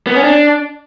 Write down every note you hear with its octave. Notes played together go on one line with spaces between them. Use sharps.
B3
C#4
D4